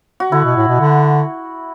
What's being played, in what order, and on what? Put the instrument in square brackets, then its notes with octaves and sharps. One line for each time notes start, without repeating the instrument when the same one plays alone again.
[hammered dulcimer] F#4
[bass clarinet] D3 [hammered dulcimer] E4
[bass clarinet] B2
A2
B2
D3